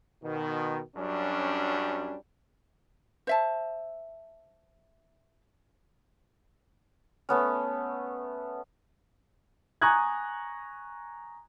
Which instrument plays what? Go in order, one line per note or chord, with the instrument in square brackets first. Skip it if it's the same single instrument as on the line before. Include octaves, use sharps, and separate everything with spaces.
[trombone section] B2 D#3
F#2 F#3 G3 C#4 D4
[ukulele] C5 E5 A5
[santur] A3 B3 C#4
[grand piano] G#5 A#5 C#6 D#6 F#6 G#6